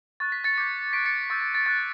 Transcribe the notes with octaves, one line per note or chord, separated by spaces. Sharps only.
C#6 F#6 A6
B6
A6 C#7
D6 G6 A6 C#7
C#6 F#6 B6 D7
A6 C#7
C#6 E6 G6 A6
A6
A6
C#6 F#6 A6